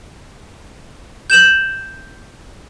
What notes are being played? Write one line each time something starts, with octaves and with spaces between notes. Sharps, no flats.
G6 E7 F#7